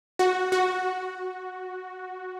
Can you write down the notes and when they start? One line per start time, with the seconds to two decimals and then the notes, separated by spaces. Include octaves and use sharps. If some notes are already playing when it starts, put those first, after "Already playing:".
0.19 F#4
0.52 F#4